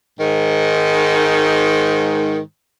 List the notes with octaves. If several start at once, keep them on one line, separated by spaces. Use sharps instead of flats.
G#2 D#3